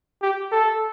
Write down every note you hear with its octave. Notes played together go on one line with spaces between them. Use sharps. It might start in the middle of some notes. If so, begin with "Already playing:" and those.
G4
A4